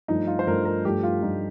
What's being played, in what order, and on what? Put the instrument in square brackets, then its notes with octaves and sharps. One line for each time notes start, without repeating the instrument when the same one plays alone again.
[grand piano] G2 F3 A3 [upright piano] D#4
[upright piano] F4
C5
[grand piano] G2 F3 A3 [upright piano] A#4
[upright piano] A#4
[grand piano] G2 F3 A3 [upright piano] G4
[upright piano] F4
[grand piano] G2 F3 A3 [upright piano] D#4